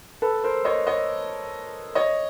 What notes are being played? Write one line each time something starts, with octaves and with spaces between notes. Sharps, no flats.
A4 B4
A#4 C5
C#5 D#5
C#5 D#5
C#5 D#5